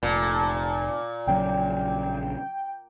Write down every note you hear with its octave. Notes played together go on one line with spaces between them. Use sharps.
F1 A#2 A5
A#1 C#3 F#3 G5